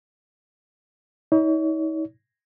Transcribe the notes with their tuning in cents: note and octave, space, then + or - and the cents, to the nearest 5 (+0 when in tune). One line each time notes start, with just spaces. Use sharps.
D#4 +45 C#5 +35